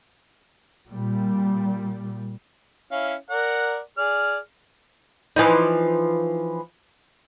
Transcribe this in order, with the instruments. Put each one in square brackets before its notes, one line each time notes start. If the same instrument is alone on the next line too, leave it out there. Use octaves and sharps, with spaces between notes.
[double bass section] A#2 G3
[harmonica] C#4 E4 F5
A#4 D5 F#5
G#4 D5 F6
[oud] E3 F3 D#4